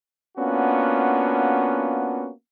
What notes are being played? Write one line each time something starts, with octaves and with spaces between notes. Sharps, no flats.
A#3 B3 C#4 D4 F4 F#4